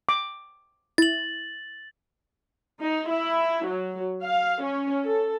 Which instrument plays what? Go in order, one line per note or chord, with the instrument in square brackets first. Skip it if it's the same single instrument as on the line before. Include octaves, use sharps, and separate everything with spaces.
[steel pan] D6
[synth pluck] E4 [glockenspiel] A6 F#7
[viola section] D#4
E4
F#3
F5
C#4
A4